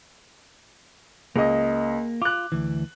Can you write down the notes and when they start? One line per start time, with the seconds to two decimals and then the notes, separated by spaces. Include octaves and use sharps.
1.36 C#2 A#3 D#5
2.22 F4 D6 F#6
2.52 D2 E3